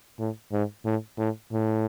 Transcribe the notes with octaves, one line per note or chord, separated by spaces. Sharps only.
A2
G#2
A2
A2
A2